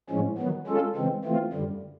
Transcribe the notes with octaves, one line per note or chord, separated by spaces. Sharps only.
A2 F3 G#3 C#4
D#3 F#3 B3
G#3 C#4 F4 A4
C#3 E3 G#3 C4
E3 A3 C4 F4
F#2 D3 G3